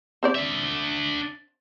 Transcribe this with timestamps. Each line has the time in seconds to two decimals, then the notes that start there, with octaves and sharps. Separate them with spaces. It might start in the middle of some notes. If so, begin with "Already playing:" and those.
0.23 C4 C5 D5
0.35 D4 E5